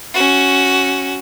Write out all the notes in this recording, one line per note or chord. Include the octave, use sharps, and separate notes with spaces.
C#4 F#4